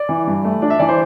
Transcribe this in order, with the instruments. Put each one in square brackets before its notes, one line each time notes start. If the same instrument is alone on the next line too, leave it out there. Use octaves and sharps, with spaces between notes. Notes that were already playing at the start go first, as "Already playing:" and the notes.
Already playing: [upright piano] D5
E3
G2
A3
D4
E5
E3 D5
C5